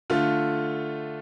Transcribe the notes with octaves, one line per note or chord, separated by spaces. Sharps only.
D3 A3 F4